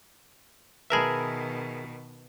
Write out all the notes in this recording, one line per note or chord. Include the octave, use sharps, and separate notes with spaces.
B2 D#3 G#4 A#4 B4 E5 A5 B5